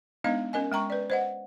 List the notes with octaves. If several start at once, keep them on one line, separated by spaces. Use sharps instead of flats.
G#3 B3 D4 D#4 D#5 F5
C#4 A#4 D#5 G#5
G#3 G5 A#5 C#6
B4 D5
C5 D#5 F#5